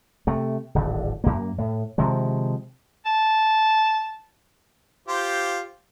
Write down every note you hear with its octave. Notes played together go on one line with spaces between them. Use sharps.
C3 A3
D1 G#1 D3
F#2 A#3
A2
C3 D#3 F3 G#3
A5
F4 G4 C5